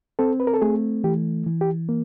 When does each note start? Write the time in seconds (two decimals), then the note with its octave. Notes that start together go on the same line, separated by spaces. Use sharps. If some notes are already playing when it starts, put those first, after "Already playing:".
0.19 C4 A4
0.40 B4
0.47 A#4
0.54 A4
0.62 A3 G#4
1.04 E3 G4
1.46 E3
1.61 G4
1.89 A#3